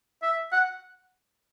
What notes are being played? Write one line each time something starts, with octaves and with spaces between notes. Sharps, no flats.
E5
F#5